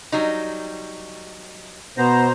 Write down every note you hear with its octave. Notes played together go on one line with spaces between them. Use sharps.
F#3 G3 D#4
B2 B3 C5 A#5